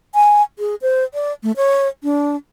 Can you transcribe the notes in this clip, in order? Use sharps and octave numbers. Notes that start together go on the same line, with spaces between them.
G#5
G#4
C5
D5
A3
C#5
D4